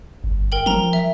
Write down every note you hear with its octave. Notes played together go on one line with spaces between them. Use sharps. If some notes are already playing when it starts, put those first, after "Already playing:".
G1
A#4 G5 F#7
F3 A#4 A#5
E5